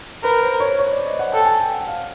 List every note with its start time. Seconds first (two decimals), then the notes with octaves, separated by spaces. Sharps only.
0.24 A#4 B4
0.42 C5
0.60 C#5
0.79 C#5
0.92 D5
1.05 D#5
1.19 F#5
1.32 A4 G5
1.46 G#5
1.60 G5
1.73 F#5
1.87 F5